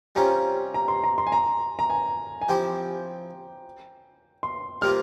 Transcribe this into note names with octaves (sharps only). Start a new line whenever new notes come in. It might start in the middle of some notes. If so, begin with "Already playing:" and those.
C3 G3 C#4 F4 A#5
A#5
C6
A#5
C6
G#5
A#5
A#5
G#5
G#5
F3 C4 E4 G4 G5
C6
C3 G3 A#3 F4 F6